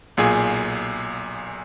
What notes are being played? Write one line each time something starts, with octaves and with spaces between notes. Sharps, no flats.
B1 A#2 G#4 G#5